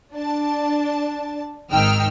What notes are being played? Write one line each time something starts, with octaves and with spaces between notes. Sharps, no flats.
D4 A5
G#1 D#3 D#4 G5 E6 F6